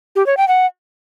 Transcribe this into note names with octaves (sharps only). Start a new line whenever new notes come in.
G4
C#5
G5
F#5